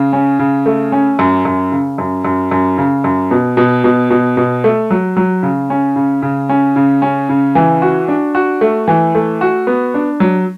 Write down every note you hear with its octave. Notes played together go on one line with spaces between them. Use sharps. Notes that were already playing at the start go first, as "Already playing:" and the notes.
Already playing: C#3
C#4
C#3
A3
C#4
F#2
F#2
C#3
F#2
F#2
F#2
C#3
F#2
B2
B2
B2
B2
B2
A3
F#3
F#3
C#3
C#4
C#3
C#3
C#4
C#3
C#4
C#3
E3
F#4
D4
F#4
A3
E3
A3
F#4
B3
D4
F#3